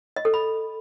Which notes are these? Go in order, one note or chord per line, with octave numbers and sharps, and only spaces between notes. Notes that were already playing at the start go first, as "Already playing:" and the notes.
D#5
A4
B5